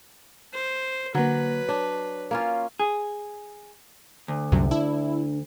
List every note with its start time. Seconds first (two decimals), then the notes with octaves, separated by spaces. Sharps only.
0.54 C5
1.15 D3 F#3 A#3 B4
1.69 D4 C#5
2.31 A#3 C#4 F4
2.80 G#4
4.28 D2
4.52 C2 F#2 C3
4.71 D4 E4